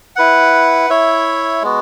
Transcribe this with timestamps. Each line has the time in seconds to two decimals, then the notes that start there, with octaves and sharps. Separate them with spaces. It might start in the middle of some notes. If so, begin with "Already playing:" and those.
0.16 E4 B4 F#5
0.90 E4 C#5 E5
1.62 G#3 B3 F#4